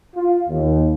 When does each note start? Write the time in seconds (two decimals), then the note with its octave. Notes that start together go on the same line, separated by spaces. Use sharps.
0.16 F4
0.48 D#2